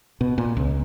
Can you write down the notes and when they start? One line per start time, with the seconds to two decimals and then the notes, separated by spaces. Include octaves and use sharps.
0.21 B2
0.38 A#2
0.57 C#2